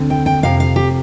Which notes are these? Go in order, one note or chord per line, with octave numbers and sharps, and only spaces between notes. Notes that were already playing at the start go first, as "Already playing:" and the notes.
Already playing: D2 D3 C4
G5
G5
F2 C3 F5
F5
G4